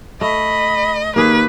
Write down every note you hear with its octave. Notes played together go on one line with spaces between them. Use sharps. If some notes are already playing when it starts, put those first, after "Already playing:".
A3 D#5 B5
D#2 A#3 G#4 B4